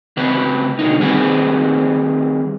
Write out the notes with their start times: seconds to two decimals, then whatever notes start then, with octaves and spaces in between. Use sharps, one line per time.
0.17 C#3 C4 B4
0.79 B2 D3 D#4
1.00 D#3 G3 C4 G#4 B4